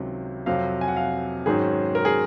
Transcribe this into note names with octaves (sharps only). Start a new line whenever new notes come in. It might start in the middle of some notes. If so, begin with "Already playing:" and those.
Already playing: C#2 C3 D#3 F#3
F2 C3 F#3 C4 F5
G#5
F#5
F5
G#2 D#3 F#3 C#4 G#4
A#4
G#4